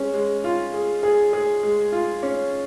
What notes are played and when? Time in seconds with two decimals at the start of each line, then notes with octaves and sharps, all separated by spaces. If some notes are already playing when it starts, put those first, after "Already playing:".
Already playing: G#3 C#4
0.14 G#3
0.44 F4
0.74 G#4
1.03 G#4
1.33 G#4
1.63 G#3
1.92 F4
2.23 C#4